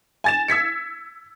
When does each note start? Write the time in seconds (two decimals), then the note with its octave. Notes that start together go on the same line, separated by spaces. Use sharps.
0.24 G#5 A6 E7
0.48 E6 G#6 B6 C#7